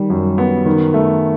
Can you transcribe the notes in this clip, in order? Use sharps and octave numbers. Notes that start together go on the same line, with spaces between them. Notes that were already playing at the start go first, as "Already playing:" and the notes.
Already playing: D#3 G3
F#2
B3
D#3
A3